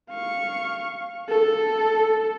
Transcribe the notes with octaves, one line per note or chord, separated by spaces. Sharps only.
F5 C#6
A4